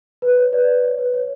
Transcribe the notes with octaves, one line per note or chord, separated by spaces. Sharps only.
B4
C#5
B4 D5
C#5
B4
C#5